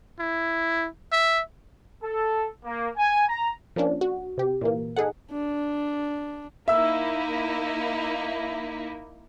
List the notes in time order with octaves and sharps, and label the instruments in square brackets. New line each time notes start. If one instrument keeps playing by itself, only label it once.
[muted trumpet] E4
E5
[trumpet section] A4
A#3
G#5
A#5
[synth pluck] F3 A#3 C#4 D4
F#4
C3 G4
A#2 E3 A#3
D#4 G#4 A4 F#5
[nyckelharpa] D4
[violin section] A#3 D#4 E4 [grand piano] E5 E6